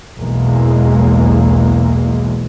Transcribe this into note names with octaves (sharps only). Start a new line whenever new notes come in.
B1 E2 E3 G#3 A#3